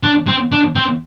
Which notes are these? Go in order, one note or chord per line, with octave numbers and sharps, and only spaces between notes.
D4
C4
D4
C4